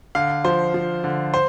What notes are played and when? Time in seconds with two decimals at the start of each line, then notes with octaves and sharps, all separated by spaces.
0.15 D3 F5
0.45 F3 C5
0.74 F3
1.04 D3
1.34 C5